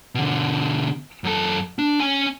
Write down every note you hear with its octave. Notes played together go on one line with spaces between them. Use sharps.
B2 D3
F#2 A4
D4
C#4 G#5